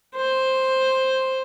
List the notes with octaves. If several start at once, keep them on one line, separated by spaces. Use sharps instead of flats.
C5